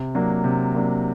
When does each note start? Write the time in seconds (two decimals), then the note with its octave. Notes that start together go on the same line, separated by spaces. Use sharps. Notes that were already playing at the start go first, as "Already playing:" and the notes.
Already playing: C3
0.15 F#3 A#3 D4
0.44 C3
0.75 F#3 A#3 D4